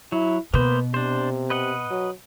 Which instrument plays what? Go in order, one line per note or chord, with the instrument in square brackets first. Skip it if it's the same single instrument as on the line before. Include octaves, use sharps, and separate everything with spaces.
[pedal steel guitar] F#3 [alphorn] E4
[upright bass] B2 [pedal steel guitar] A#3 B3 C5 [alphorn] B4
[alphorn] C3 [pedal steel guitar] D4 C5
[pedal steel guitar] B4 D#5 F#5
[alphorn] F#3